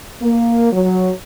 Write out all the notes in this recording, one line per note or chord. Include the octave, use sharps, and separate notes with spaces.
A#3
F#3